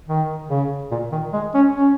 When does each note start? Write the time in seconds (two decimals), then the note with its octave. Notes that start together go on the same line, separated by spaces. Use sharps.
0.09 D#3
0.49 C#3
0.91 A#2
1.12 D#3
1.33 G#3
1.54 C#4
1.76 C#4